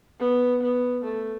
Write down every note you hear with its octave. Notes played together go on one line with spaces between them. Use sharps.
B3
B3
A3